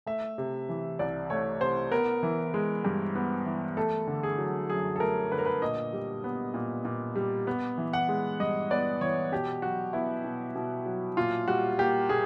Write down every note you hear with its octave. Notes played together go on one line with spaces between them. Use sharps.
A3 E5
C3
E3
C2 D5
A3 C#5
C3 C5
B3 A#4
E3
G#3
G2
B3
E3
A3 A4
D3
G#4
F#3
F#2 G#4
A4
A3 A#4
D3 B4
A#4
B4
A#2 D#5
G3
B3
A#2
A#2
G3
B3
E3
F#5
G#3
G2 D#5
B3 D5
E3 C#5
B2 G4
F#3 F#4
B3 E4
B2
B2
F#3
A#2 F4
G3 F#4
A#3 G4
A#2 G#4